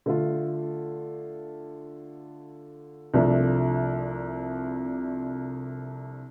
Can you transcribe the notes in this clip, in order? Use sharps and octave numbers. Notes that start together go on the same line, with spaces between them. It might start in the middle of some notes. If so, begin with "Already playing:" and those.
D3 A3 F4
C2 C3 F3 A3 D4